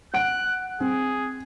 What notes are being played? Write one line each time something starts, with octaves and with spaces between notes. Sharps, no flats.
F#5 F#6 D7
C4 G#4